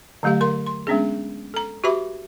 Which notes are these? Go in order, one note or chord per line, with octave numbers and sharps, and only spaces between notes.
D3 F#3 A3 G4 F5
D3 A#4 C6
C6
G#3 B3 C#4 D4 G#4
A4 A#5
F#4 G4 B4 E5 B5 D6